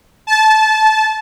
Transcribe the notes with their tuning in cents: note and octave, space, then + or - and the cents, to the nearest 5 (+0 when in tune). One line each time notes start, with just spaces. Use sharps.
A5 -20